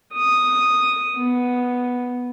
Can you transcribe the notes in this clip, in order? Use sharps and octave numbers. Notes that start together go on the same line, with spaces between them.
D#6
B3